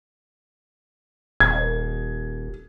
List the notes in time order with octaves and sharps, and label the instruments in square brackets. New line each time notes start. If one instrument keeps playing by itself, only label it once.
[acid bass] D#1 [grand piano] G#6